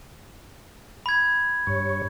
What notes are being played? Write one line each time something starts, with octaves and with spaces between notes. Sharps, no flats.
B5 G#6
G2 C#5